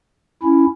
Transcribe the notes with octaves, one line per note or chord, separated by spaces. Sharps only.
C#4 E4